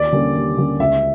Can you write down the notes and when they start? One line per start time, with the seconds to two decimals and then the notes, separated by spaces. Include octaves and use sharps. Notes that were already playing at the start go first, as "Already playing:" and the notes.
Already playing: D#2 D5
0.12 D3 G3 A#3 C#4
0.35 D#2
0.57 D3 G3 A#3 C#4
0.80 C#2 E5